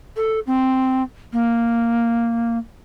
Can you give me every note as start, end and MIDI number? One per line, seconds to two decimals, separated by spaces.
0.16 0.40 69
0.47 1.03 60
1.33 2.58 58